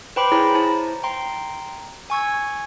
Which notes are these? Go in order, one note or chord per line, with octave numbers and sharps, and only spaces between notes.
B4 C5 G5 B5 C6 D6
E4 G#4 C#5 A#5 B5
E4 C5 C#5 A5 A#5
G5 A#5 C6
G#5 C#6 E6 G#6